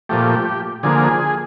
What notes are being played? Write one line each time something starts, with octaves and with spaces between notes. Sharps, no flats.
A#2 F3 A3 G4
D3 F3 A#3 G#4